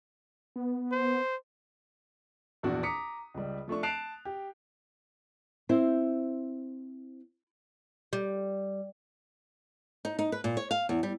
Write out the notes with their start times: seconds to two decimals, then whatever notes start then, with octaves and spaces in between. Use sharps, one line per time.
0.56 B3
0.92 C5
2.63 A#1 E2 D4 F#4
2.83 A#5 D6 D#6 B6 C#7
3.34 C#2 G3
3.68 F3 A3 D4 C#6
3.83 A5 F#6 C7 D7 F7
4.25 G4
5.69 C4 E4 C5
8.13 G3
10.05 D#4
10.19 D#4
10.32 B4
10.44 A#2
10.57 C#5
10.71 F5
10.89 E2
11.03 G3